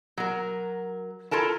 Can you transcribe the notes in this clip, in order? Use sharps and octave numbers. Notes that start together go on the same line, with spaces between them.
F#3 A#4
E4 F4 A4 A#4 A5